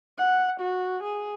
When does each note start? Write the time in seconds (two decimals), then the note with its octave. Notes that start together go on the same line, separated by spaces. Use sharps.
0.18 F#5
0.60 F#4
1.03 G#4